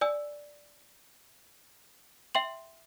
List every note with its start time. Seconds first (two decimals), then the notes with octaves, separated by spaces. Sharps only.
0.01 D5 G#5 E6
2.35 E5 G5 C6 F#7